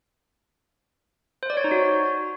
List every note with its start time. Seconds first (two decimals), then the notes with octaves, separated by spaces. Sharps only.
1.43 C5
1.50 D5
1.57 C#5
1.64 D#4
1.71 F#4